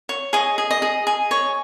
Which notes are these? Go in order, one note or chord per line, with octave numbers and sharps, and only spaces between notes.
C#5
G#4 D#5
G#4
D#5
G#4
G#4
C#5